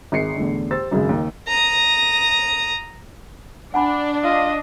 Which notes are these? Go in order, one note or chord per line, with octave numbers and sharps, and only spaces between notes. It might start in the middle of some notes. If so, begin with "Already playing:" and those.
G#1 G#4 C7 C#7
E2 A2 D3
G4 C5 E6 A6
G#1 F#2 C#3 G#3
D#2
A#5 D#6
D4 F#5 G#5 B5
F4 D#5